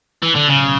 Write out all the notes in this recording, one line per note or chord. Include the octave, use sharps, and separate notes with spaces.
E3
D3
B1 A2 C#3 F#3